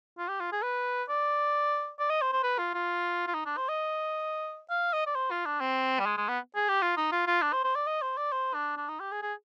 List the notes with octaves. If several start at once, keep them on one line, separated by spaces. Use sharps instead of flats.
F4
G4
F4
G#4
B4
D5
D5
D#5
C5
C5
B4
F4
F4
F4
D#4
D4
C5
D#5
F5
D#5
D5
C5
F4
D4
C4
G3
G#3
G#3
B3
G#4
G4
F4
D#4
F4
F4
D4
C5
C5
D5
D#5
C5
D5
C5
D4
D4
D#4
G4
G#4
G#4